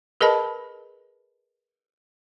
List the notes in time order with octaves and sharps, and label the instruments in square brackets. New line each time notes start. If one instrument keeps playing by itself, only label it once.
[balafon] G#4 A#4 B4 D#5 A5 B5